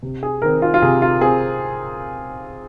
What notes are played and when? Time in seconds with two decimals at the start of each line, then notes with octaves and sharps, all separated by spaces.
0.03 C3
0.23 G#4
0.42 D#3 C4 A#4
0.62 F4
0.74 F4
0.82 C3 G#4
1.02 F4
1.21 C4 G#4